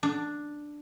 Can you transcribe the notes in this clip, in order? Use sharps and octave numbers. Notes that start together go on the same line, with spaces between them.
D4